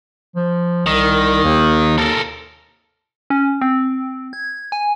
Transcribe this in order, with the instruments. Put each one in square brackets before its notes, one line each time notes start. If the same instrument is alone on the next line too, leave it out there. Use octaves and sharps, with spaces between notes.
[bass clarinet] F3
[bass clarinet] C2 [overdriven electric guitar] D#3
[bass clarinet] D#2
[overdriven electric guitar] A4 A#4
[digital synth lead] C#4
C4
G#6
G#5